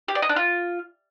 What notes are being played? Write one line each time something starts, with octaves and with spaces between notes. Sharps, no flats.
G4
D5
D#5
D4
F4